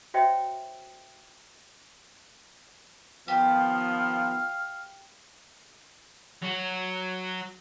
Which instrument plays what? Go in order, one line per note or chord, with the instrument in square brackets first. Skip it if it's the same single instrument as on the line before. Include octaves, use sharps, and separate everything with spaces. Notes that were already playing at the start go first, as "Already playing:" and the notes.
[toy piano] F#4 C5 C#5 D#5 E5 G5
[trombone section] D#3 F3 B3 [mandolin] G4 [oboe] F5
[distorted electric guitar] F#3 F#4